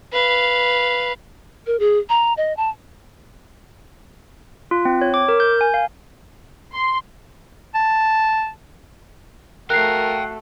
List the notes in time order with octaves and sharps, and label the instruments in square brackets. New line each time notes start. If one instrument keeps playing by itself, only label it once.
[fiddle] B4 F5
[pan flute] A#4
G#4
A#5
D#5
A5
[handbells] F4
C4
C#5
D6
A#4
G6
G#5
F5
[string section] C6
[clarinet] A5
[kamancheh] A3 F#4 [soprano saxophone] A#4 [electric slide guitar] F5 G5 [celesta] F#6 C7